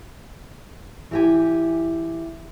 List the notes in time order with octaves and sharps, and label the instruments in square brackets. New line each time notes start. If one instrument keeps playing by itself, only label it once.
[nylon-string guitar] E3 G4 G#5